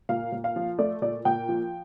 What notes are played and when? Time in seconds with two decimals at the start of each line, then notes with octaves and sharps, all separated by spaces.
0.09 A#2 F5
0.32 A#2
0.44 F5
0.56 F3
0.79 A3 D5
1.02 A#2 D5
1.25 A#2 G5
1.49 F3